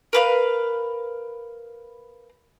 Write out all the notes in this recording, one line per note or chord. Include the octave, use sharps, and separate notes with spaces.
A#4 B4 F5